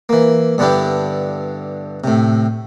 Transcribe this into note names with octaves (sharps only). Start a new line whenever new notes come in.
E3 A#3
G2 D3 B3 D4 E4 G4
A2 C3